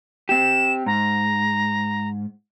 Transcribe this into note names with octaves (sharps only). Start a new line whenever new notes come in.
C4 G4 E7
G#2 A#5